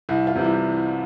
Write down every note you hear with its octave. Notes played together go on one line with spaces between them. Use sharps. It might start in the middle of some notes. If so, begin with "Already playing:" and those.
C2 E4
F4
C3 E3 G3
E4